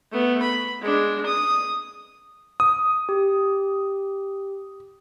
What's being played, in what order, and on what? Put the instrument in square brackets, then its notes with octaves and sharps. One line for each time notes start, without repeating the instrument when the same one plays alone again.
[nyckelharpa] A3 B3
B5
G#3 D4
D#6
[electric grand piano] D#6
[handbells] G4